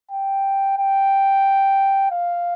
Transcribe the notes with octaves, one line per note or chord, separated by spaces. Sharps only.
G5
G5
F5